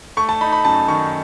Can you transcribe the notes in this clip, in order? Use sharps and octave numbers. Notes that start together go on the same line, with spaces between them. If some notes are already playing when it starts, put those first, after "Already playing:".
A3 C#6
A5
D#4 B5
B5
F#2 A5
D#3 C#6